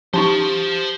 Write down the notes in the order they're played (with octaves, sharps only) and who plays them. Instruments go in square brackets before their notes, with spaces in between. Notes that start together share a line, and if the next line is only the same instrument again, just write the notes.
[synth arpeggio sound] F3 D#4 [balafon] C#4 C6 C#6 [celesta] G4 [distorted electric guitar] C5 A5